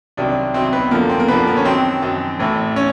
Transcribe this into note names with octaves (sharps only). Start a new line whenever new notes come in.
C2 C3 D#3 F#3 D4
C2 C3 D#3 F#3 C4
B3
F#2 D3 F3 A#3
C4
A#3
F#2 D3 F3 B3
A#3
C#4
F#2 D#3 F#3 C4
F#2 D#3 F#3
A1 A2 E3
C#4